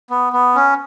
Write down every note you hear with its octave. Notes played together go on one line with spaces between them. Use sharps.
B3
B3
C#4